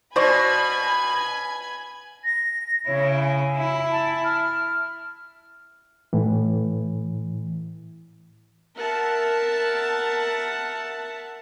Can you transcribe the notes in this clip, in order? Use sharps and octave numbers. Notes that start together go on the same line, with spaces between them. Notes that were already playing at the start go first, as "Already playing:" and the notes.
B2 C5 D5 G#5 B5 C#6 G#6
A#6
C#3 E4 C#5
G#5
E4
A5
F6
A2 E3
A#4 E5 F#5 A5